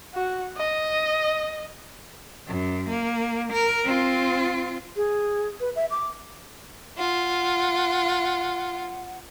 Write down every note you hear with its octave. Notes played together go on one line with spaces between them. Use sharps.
F#4
D#5
F#2
A#3
A#4
C4 F4
G#4
B4
E5
D6
F4 F#5